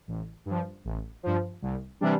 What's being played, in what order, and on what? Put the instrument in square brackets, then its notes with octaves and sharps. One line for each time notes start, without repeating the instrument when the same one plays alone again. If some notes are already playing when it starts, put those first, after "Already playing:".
[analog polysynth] A1
G2 F3
A1
G2 F3
C2
C3 E3 G3 D4